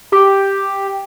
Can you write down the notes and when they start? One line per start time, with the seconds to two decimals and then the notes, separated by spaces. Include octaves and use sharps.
0.12 G4